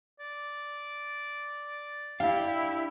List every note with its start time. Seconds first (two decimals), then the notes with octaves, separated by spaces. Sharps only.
0.19 D5
2.20 D4 E4 G4 F5